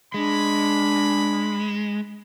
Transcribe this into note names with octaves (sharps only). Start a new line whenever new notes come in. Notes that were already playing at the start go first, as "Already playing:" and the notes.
G#3 D4 B5